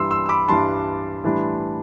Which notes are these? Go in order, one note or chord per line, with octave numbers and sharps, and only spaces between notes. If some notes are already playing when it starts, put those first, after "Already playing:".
Already playing: G2 E3 G3 D4 C6 E6
C6 E6
E6
B5 D6
G2 E3 G3 D4 A5 C6
A2 E3 G3 D4